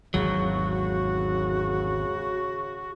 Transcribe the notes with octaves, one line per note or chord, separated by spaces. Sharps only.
G#1 E2 C#3 F#3 F#4